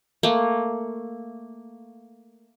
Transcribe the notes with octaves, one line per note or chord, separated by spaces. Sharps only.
A3 A#3